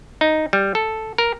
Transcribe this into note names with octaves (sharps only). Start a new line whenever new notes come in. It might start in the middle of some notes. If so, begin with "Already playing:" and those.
D#4
G3
A4
A#4